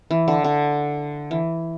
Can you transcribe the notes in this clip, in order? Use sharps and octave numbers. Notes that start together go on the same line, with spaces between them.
E3
D3
D3
E3